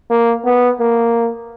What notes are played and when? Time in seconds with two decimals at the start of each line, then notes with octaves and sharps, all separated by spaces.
0.10 A#3
0.45 B3
0.80 A#3